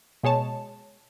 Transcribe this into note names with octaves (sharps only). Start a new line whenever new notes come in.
B2 G#3 C#5 A5